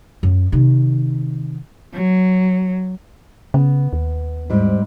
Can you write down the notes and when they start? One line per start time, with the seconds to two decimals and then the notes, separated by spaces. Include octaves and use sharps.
0.23 F#2
0.52 C3 D#3
1.93 F#3
3.54 C#3 B3
3.93 D#2
4.50 G#2 G3 C4